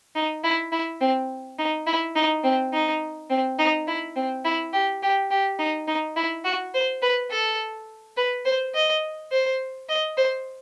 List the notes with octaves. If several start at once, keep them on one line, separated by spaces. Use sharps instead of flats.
D#4
E4
E4
C4
D#4
E4
D#4
C4
D#4
C4
D#4
E4
C4
E4
G4
G4
G4
D#4
D#4
E4
F#4
C5
B4
A4
B4
C5
D#5
C5
D#5
C5